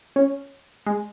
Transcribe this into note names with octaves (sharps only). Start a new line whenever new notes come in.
C#4
G#3